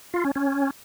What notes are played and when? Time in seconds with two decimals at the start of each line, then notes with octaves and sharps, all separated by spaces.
0.14 F4
0.25 C#4
0.36 C#4